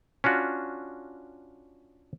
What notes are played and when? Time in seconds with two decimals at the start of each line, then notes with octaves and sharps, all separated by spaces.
0.24 C#4 D4 F4 F#4